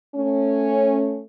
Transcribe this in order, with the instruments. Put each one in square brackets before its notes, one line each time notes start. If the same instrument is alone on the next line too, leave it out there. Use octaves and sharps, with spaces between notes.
[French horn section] A3 C#4